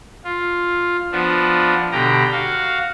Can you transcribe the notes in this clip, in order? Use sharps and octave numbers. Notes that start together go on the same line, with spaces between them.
F4
F3 B3 D4
B2 D3 G4 A#5
F#4 F5